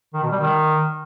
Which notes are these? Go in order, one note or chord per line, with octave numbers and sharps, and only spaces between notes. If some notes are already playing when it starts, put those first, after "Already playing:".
D#3
B2
G3
D#3